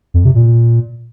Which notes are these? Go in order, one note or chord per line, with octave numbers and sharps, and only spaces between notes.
F2
C3
A#2